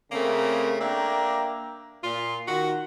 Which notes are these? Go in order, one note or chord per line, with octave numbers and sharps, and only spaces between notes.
C#3 A3 A#3 C4 A#4
A#3 D4 E5 G5 A#5
A#2 F4
D#3 F#4